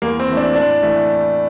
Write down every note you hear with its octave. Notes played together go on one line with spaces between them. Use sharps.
E2 A#3
C4
E3 A3
D4
A2 D4
E3 A3